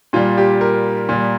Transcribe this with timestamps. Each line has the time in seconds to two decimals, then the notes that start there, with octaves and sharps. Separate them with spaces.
0.13 A#2 G3 F4
0.38 G4
0.61 A#4
1.09 A#2 G3